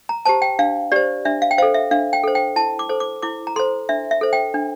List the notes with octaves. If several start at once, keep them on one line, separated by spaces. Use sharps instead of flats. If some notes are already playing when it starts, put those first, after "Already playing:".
A#5
G4 C5 A5
G5
D4 F5
G4 C5 D5
D4 E5
F5
G5
A4 C5 F5
E5
D4 F5
G5
A4 C5
G5
E4 A5
D6
A4 C5
D6
E4 D6
A#5
A4 C5 C6
D4 E5
E5
A4 C5
G5
D4